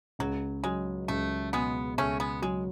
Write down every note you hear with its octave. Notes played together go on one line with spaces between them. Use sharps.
C#2 F#3
F#3 G#3
C#2 A3
B2 G#3 B3
C#2 A3 C#4
G#3 B3
F#3 G#3